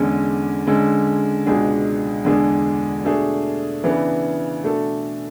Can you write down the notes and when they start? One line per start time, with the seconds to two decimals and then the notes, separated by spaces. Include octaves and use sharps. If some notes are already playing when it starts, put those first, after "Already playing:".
Already playing: E2 D3 G#3 C#4
0.67 D3 G#3 C#4
1.46 C#2 B2 G#3 D4 G#4
2.25 E2 D3 G#3 D4 G#4
3.04 B2 A3 D4 G#4
3.84 C#3 E3 B3 D4
4.63 B2 A3 D4 A4